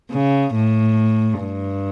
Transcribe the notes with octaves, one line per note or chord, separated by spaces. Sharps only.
C#3
A2
G2